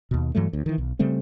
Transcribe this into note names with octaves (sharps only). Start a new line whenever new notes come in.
D#2 B2
G2 E3 F#3 A3
D2
D#3 E3
B1
C#3 G3 A3 C4